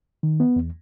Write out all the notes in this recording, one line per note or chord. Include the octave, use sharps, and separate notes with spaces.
D#3
B3
E2